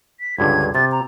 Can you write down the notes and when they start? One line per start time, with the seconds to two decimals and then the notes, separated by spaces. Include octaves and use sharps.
0.20 B6
0.38 C#2 G2 D3 G#6
0.75 C3 A6
0.92 A#5